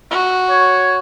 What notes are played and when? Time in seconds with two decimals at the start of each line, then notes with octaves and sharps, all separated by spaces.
0.10 F#4
0.50 C#5